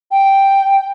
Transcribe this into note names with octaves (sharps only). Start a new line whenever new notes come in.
G5